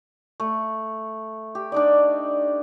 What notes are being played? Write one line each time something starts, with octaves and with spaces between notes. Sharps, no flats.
A3
G4
D4 D#4 D5